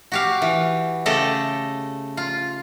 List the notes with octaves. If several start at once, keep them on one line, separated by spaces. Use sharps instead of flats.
F#4 G4 F5
E3
C#3 A3 G4 A4 D#5
F4